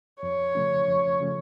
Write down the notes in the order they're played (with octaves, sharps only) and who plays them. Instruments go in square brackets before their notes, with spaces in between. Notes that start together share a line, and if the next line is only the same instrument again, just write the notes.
[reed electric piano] F2 [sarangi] C#5
[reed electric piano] C#3 F3 A3 C#4
F2
C#3 F3 A3 C#4